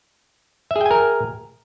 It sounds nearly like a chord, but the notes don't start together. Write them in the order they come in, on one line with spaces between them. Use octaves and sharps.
E5 G#4 G5 G#5 A#4